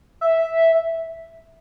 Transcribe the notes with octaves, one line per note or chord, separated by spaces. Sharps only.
E5